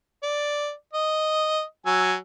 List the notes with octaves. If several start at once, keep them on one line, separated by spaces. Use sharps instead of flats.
D5
D#5
F#3 G#5 E6